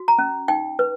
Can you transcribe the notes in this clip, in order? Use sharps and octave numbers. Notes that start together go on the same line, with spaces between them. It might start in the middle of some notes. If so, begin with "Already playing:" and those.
Already playing: F#4
A#5
C#4
D#4 G5
B4